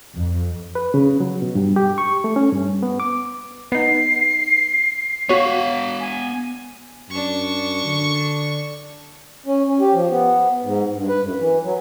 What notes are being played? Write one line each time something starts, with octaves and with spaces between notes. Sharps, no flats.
F2
B4
C#3
F#3
B2
G2
G4
C#6
A3
C#4
G2
B3
D6
B3 D#4 C7
B3 F#4 C#5 F5
G#5
F#2 D4 C#6
D3
C#4
C#4
G4
F3
B3
G#2
G2
B4
F#2
E3
F#3